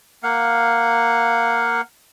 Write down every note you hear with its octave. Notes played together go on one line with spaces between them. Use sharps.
A#3 F5 F#5